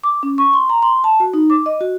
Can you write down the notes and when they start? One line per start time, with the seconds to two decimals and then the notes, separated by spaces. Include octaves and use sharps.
0.04 D6
0.23 C#4
0.38 C#6
0.54 C6
0.70 A#5
0.83 C6
1.04 A5
1.20 F#4
1.33 D#4
1.50 D6
1.66 D#5
1.81 F#4